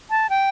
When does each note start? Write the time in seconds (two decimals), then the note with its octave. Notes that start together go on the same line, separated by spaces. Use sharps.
0.10 A5
0.30 G5